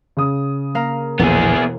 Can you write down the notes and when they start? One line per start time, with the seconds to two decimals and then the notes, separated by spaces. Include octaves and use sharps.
0.17 C#3 D#6
0.75 A#3 F5 A#5
1.19 E1 A#1 E2 D3 B3 G#4